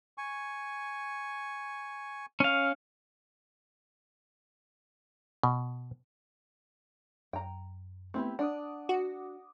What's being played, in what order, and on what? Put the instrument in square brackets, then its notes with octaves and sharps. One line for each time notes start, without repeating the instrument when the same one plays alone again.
[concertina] G#5 C#6
[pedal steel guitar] C#4 F5
[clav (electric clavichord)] B2
[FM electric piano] F#2 [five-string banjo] G5 A#5
[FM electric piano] A3 B3 [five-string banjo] C4 E4 G4
[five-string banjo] D4 [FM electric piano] F#5 D6 D#6
[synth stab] F#4